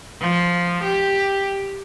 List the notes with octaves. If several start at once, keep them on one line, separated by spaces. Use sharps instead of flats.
F3
G4